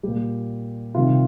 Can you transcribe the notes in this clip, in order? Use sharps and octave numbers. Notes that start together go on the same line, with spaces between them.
A#2 G3 G4
C3 D#3 G3 F4